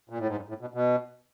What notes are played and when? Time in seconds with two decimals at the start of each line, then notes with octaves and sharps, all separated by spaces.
0.09 A#2
0.18 A2
0.27 G#2
0.36 G2
0.49 A2
0.61 B2
0.74 B2